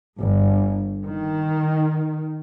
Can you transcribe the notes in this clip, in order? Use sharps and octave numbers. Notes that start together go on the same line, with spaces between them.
G1
D#3